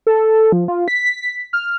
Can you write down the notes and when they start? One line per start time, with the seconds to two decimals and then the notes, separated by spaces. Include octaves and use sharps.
0.07 A4
0.52 F3
0.68 F4
0.88 B6
1.53 F6